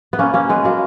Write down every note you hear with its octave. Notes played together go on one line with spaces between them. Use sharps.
B3
A#3 C#4
A#3 C#4
G#3 B3
F#3 A#3